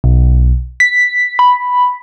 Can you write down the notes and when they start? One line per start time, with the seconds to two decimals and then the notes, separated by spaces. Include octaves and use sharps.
0.04 B1
0.80 B6
1.39 B5